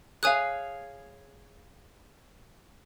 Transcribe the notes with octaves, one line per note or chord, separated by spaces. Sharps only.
G#4 C#5 F5 G#5 D#6 F#6